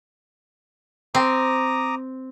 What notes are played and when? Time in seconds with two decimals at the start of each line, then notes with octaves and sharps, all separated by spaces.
1.15 C4 A#5 D6 D#6